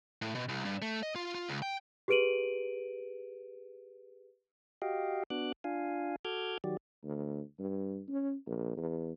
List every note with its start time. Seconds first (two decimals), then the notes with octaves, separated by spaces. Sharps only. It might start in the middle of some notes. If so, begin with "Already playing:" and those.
0.22 A2
0.35 B2
0.49 C2
0.65 G2
0.82 A3
1.03 D#5
1.15 F4
1.35 F4
1.49 C#2
1.62 G5
2.08 G4 G#4 B4 D7 D#7 F#7
4.82 F#4 G4 D#5 F5 G5
5.30 B3 D4 F#4 D6 F#6
5.64 D4 F4 F5 G#5
6.25 F#4 A4 D6 F6 G6 G#6
6.64 D#3 F#3 F#4 G4 D5
7.04 D2
7.59 G2
8.08 C#4
8.47 A#1
8.77 E2